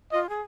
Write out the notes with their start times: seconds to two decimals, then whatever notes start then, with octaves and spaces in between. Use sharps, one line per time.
0.12 F4 D#5
0.29 G#4